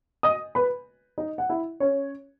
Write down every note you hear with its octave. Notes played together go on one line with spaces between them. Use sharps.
D#5 D#6
B4 B5
D#4 D#5
F#5
E4 E5
C#4 C#5